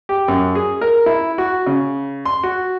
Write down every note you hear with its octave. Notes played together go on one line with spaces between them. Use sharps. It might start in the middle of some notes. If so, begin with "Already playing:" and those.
G4
F#2
G#4
A#4
E4
F#4
C#3
C6
F#4